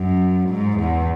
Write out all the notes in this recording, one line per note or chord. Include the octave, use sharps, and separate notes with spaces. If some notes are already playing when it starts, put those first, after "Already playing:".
Already playing: F#2
G#2
E2